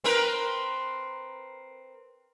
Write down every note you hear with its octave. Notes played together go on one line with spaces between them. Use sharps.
C4 A#4 B4